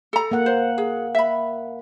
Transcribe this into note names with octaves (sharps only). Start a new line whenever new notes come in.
A4 A#5
A#3 F#5
C5
G#4
E5 B5